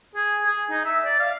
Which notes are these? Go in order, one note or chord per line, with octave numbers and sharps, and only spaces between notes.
G#4
G#4
D#4
E5
D5
F5